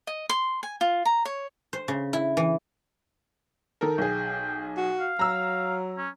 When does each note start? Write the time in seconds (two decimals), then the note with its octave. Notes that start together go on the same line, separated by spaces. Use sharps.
0.07 D#5
0.29 C6
0.63 G#5
0.81 F4
1.05 A#5
1.25 C#5
1.73 C5
1.88 C#3
2.13 E4
2.37 E3
3.81 D#3 A4 A#4
3.98 B1 G#4 G5
4.77 F#4
5.00 F5
5.19 F#3 A#5 E6
5.98 C#4